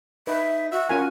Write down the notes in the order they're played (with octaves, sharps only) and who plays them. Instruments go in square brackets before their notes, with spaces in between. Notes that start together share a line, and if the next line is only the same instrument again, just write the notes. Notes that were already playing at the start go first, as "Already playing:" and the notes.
[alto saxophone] D#4 [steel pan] B4 [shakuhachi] E5
[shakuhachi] F#4 [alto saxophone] E5
[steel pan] C#4 F4 G#5 [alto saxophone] A#4